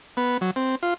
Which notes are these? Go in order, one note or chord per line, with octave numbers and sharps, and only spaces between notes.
B3
F#3
C4
F4